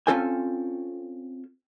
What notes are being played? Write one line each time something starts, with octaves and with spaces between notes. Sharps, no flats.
C4 C#4 F4 A4 G5 G#5